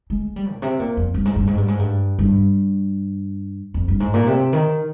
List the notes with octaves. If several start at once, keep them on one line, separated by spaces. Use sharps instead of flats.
G#3
G3
A#2
C3
A#2
F2
G2
G#2
G2
G#2
G2
G#2
G2
G2
F2
G2
G#2
A#2
C3
D#3